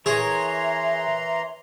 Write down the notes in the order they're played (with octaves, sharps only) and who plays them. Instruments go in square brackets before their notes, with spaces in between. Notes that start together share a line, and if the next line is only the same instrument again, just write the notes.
[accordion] E3 A#5 C6 [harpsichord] G#4 [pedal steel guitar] A#4 C#5 [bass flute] E5